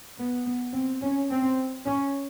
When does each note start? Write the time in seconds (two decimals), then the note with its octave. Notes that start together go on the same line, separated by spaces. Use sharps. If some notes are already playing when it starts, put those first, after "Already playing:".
0.18 B3
0.46 B3
0.73 C4
1.02 C#4
1.30 C4
1.86 C#4